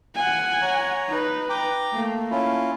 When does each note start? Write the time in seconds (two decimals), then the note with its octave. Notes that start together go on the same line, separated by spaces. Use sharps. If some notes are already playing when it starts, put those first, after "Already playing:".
0.15 F#5 G#5
0.62 C#5 A#5
1.09 D#4 B4
1.49 G5 A#5 D6
1.93 A3 A#3
2.31 C#4 E4 F4